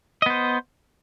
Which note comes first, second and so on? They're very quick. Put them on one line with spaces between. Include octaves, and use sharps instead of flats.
D#5 B3 C5